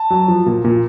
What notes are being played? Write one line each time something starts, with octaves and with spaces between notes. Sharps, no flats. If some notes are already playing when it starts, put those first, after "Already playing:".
Already playing: A5
F#3
F3
A#2
A#2